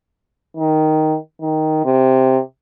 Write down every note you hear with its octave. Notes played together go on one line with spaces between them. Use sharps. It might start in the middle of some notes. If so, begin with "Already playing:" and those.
D#3
D#3
C3